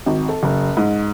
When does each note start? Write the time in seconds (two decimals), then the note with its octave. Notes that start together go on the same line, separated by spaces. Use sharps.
0.06 G#1
0.29 A4
0.43 F#1
0.77 G#2